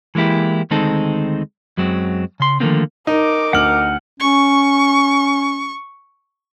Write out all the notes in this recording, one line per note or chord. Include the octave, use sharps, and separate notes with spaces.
E3 G#3 A#3 E4 G4
D2 D#3 G#3 C4 D#4 A4
F#2 F#3 G#3 C4
C#3 C6
D3 D#3 F3 A3 A#3 C4
D#4 A#4 D6
D2 F#5 F6 F#7
C#4 C#6